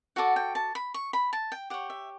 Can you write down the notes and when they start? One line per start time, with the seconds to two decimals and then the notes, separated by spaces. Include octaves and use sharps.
0.16 F#4 A4 D5 F#5
0.36 G5
0.55 A5
0.75 B5
0.94 C#6
1.13 B5
1.33 A5
1.52 G5
1.70 G4 C#5 F#5
1.90 E5